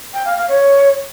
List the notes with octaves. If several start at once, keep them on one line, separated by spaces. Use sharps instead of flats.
G5
F5
F5
C#5